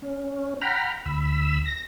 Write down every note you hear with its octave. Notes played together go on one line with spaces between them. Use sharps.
C#4
F#5 G5 A#5 B5 F6
D2 B5 E6
A#6